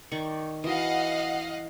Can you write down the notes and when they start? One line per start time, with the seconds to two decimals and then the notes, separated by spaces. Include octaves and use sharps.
0.11 D#3 D5 C#6
0.64 E3 F#4 D#5 F5 F#5